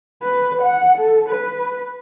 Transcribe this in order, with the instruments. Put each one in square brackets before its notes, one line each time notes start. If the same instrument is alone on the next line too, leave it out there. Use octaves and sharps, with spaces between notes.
[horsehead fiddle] B4
F#5
A4
B4